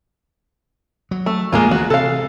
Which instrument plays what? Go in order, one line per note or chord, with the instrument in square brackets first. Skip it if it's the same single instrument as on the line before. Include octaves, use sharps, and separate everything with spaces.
[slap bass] F#3
[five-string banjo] A3
[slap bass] D1 A#1 E2 [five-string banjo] G#3 A#3 F4
[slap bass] E3 F#3 A3 [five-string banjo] F#4
[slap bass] C3 [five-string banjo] A4 F5